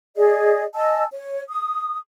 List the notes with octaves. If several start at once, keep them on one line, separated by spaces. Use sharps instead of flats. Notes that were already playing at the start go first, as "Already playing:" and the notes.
G#4 D5 D#5
D#5 G#5 A5 E6
C#5
D#6